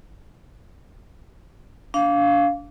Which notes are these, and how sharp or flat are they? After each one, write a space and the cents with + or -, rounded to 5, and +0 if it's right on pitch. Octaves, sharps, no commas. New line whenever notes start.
D4 -25 F5 +0